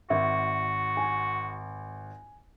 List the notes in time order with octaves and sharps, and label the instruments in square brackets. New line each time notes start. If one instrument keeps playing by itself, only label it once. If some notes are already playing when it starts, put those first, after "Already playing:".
[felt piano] G#1 [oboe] F#4 [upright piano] E5
[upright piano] G#5